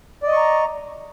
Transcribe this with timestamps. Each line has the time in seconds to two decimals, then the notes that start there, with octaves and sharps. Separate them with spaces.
0.23 D5
0.28 D#5
0.32 C#6
0.37 A#5